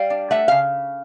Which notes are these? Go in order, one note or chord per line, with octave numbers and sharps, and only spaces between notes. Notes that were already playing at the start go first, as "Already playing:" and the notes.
Already playing: G3 F5 G5
D4
A3 E5 F#5
C#3 F5